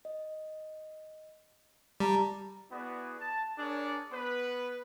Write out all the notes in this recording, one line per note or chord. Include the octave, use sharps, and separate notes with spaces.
D#5
G3 G4 A5 A#5
B3 E4 F#4 G#4 D5
A5
D4 G#4 A#4 C#5 D5
B3 B4